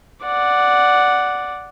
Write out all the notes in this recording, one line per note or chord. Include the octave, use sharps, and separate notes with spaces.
D5 F#5